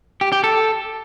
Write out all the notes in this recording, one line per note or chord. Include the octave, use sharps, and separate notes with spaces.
G4
G4
A4